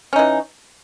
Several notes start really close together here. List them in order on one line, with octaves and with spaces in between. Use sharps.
C#4 D#4 E3